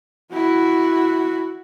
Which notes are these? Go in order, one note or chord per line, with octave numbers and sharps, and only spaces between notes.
E4 F#4